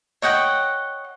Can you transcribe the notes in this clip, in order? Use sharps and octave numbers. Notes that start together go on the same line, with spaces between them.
C#5 D#5 F#5 G5